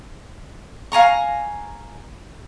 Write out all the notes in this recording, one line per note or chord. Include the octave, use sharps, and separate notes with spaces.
F5 G#5 A#5 C#6